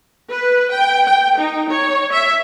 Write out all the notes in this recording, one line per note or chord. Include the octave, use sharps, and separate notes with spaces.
B4
G5
G5
D#4
C#5
E5